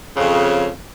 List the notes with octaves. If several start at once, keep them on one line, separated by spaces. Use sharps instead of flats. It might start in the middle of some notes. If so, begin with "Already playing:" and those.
F2 C#3